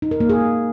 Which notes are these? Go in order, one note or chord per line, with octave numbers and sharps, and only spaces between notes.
D#4
A#4
A#3
G#4